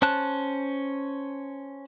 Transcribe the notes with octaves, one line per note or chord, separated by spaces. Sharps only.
C#4 C5 A5 F#6